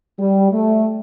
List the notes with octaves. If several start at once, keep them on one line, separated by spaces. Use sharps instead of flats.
G3
A3